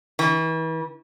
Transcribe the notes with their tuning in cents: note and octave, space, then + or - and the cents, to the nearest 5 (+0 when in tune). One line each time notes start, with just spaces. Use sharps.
E3 -35